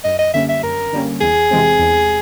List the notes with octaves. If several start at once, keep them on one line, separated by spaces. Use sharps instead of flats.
F#2 D#5
D#5
D3 G3 A#3 C#4 E5
E5
F#2 A#4
D3 G3 A#3 C#4
E2 G#4
C3 E3 G#3 C4
E2